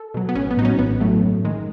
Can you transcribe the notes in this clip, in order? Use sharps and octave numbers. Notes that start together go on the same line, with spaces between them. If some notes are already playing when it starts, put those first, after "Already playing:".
Already playing: A4
B2 F#3
B3
A1 C#4
B3
A2 F#3 C#4 D#4
A1 B3
A2 F#3 A3
F#2
D#3 G#3